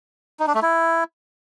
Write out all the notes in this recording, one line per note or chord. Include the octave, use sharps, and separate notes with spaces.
D#4
D4
A3
E4